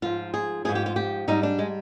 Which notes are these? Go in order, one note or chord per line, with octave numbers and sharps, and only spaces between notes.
G#2 F3 F4
G#4
G#2 F3 G#4
G4
F4
G4
G#2 G3 D#4
D4
G#3